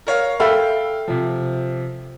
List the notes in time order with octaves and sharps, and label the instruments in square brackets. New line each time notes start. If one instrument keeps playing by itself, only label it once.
[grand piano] A#4 C#5 F5
[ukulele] A4 E5 B5 [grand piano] F5 G5
[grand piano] C3 F3